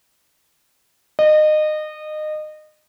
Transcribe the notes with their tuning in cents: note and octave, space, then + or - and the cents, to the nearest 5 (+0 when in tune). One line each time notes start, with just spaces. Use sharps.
D#5 -25